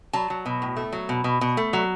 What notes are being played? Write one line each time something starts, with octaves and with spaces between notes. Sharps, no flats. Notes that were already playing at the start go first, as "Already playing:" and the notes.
F#3 A5
F#3
B2
A2
A3
F#3
B2
B2
B2
A3
F#3